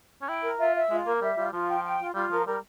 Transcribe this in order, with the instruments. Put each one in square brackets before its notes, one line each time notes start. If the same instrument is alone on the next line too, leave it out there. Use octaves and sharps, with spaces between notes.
[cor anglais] C#4
[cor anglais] E4 [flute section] G5
[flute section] A#4
[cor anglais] F4 [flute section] E5
[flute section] E5
[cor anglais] G#3 [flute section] F4
[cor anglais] A#3 [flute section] A#4
[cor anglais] G3 [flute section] E5
[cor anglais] G3 [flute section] F4
[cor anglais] F3 [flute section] F4
[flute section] G5
G5
F4
[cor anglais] G3 [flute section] F4
[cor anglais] F3 [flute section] A#4
[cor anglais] G3 [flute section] A#4